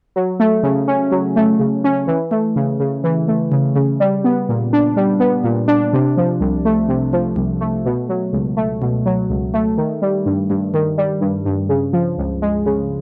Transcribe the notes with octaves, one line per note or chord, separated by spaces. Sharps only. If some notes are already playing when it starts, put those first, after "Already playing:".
F#3
A3
C#3
C#4
F#3
A3
C#3
C#4
E3
A3
C#3
C#3
E3
A3
C#3
C#3
G3
B3
A#2
D4
G3
B3
A#2
D4
C3
F3
C2
A3
C3
F3
C2
A3
B2
F#3
C#2
A3
B2
F#3
C#2
A3
D#3
G3
G2
G2
D#3
G3
G2
G2
C#3
F3
C#2
G#3
C#3